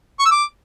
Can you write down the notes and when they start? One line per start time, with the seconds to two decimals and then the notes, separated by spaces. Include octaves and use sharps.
0.19 C#6
0.25 E6
0.31 D6